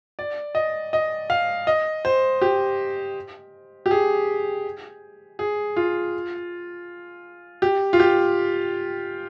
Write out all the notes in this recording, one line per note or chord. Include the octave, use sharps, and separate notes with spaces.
D5
D#5
D#5
F5
D#5
C5
G4
G4
G#4
G#4
F4
G4
F4
G4